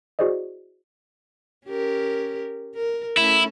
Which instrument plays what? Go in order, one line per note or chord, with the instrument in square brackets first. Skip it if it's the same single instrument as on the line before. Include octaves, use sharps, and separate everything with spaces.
[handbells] E4 F#4 G#4 C5 D5 D#5
[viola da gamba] C#4 G4 A#4
A#4
[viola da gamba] A3 C#4 A4 [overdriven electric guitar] E4